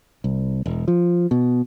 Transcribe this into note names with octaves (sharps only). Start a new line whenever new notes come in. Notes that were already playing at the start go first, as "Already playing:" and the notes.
C2
E1
F3
B2